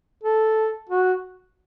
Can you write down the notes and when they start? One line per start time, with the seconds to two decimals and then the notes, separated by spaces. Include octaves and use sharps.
0.24 A4
0.89 F#4